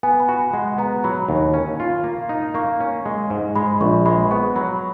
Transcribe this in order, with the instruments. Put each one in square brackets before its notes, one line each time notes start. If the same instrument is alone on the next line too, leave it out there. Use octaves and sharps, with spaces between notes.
[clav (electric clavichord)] B3 [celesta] G#5
[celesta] B5
[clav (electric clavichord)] F#4
[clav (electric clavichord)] G#3 [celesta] F#5
[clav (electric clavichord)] B3 [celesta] A#5
[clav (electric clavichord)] F#3 [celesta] B5
[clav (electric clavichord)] D#2
C#4
F4
A#3
D#4
[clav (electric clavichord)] A#3 [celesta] C#6
[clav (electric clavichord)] C#4
G#3
G#2
[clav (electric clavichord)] G#3 [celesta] B5
[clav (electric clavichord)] A#1 [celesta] C#6
[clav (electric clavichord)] G#3 [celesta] B5
[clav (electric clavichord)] B3 [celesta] C#6
[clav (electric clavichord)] F#3 [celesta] B5